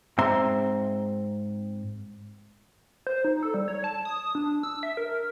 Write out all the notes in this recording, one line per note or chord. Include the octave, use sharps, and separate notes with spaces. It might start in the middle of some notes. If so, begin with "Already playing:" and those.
G#2 C4 E5 A#5 C6
C5
D#4
A4
G3
C#5
A5
D#6
D4
E6
E5
A#4